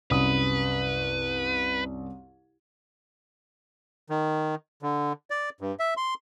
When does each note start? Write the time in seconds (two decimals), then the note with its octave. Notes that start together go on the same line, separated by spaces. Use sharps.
0.11 C2 F#2 B4 D#6
4.10 D#3
4.82 D3
5.30 D5
5.61 G2
5.79 E5
5.97 C6